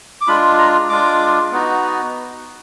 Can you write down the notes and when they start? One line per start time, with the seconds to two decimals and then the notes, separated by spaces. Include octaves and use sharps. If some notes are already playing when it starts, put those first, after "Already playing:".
0.21 D6
0.27 G#3 D4 F4 B5
0.59 A#5
0.89 G#3 D4 F4 D6
1.52 B3 D#4 F#4